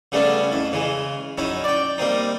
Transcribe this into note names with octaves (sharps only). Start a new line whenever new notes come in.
C#3 G3 A3 B3 C#4 D4
F2 E4
C#3 E3 G#3
F#2 C#4 D#4 E4
D5 G5
G3 A#3 C4 D#4